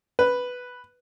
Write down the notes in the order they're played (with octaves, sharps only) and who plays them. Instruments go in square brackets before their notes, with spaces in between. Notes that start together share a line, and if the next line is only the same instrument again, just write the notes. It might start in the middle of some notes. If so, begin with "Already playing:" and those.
[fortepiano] B4